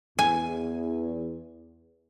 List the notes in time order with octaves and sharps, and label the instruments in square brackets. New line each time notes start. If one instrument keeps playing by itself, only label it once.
[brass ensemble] E2 [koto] G#5